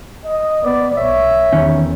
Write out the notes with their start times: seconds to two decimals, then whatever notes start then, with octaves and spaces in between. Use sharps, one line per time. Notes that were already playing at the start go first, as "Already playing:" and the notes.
0.24 D#5
0.63 B3 D5
0.97 B1 C#5 E5
1.53 E2 D#3 C#4